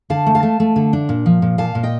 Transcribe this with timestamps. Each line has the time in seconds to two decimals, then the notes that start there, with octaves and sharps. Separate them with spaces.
0.10 D3 F5 A5
0.26 A3
0.35 F5 A5
0.43 A3
0.60 A3
0.76 D3
0.93 D4
1.09 A#2
1.26 F3
1.42 A#2
1.58 A#2 F5 A5
1.75 A#2
1.83 D#5 G5